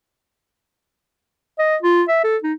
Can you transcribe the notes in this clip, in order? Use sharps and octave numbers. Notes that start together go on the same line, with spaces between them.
D#5
F4
E5
A4
D#4